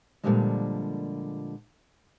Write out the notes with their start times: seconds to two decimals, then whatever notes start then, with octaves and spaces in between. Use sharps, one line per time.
0.23 A#2 D3 D#3 F3 G3 G#3